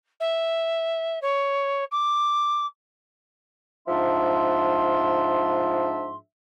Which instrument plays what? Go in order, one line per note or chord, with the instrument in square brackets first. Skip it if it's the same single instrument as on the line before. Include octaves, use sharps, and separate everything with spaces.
[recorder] E5
C#5
D6
[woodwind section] G#2 F3 D4 E5 C6